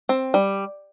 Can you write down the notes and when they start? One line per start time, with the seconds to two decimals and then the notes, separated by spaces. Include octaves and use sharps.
0.09 C4
0.34 G3